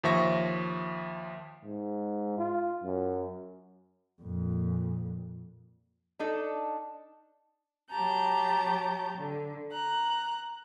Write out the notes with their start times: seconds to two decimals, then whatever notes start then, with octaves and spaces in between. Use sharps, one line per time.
0.04 D#2 F3 E5 C#6 A#6
1.65 G#2
2.38 F4
2.83 F#2
4.21 F2 A#2
6.19 D4 D#4 A4
7.91 F#3 G4 A5 A#5 G6
9.17 D3
9.72 A#5 F#6